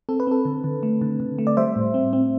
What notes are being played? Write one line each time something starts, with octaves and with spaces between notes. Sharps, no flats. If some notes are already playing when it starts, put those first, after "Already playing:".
C4 A4
B4
C4 A4
D3
D3
A3
D3
D3
A3
D5
G3 C5 E5
A2
C4
C4